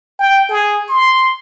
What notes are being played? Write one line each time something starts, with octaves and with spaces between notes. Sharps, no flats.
G5
G#4
C6